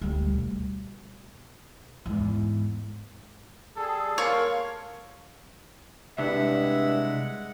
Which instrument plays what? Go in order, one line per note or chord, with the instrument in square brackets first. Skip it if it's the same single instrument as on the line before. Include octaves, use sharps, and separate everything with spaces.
[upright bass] D2 G3
B2
E2 G#2
[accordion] G3 G#4 [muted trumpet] A4
[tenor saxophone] A#3 [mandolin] C#5 [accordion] F5 C6
[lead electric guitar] C2 [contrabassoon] G2 [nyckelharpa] G#3 F#5 [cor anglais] E5